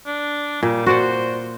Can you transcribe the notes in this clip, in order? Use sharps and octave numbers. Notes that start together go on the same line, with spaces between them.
D4
A#2 G3
F#4 C5 D5 F#5